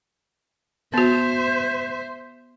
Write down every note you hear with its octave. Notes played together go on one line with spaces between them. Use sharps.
B3 F#4 C5 E5